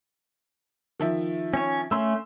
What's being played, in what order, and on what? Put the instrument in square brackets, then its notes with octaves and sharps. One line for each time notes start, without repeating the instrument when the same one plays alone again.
[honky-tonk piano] D#3 F3 E5
[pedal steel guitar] C#4 C#5
[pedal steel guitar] A3 C#4 [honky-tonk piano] C6 E6